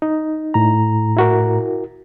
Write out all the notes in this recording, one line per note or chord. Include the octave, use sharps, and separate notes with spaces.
D#4
A2 A#5
E4 F#4 A#4